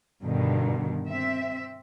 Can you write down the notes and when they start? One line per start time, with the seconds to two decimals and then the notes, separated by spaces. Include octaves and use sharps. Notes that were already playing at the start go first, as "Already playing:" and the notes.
0.23 G2 B2 D3 D#3
1.08 C4 E5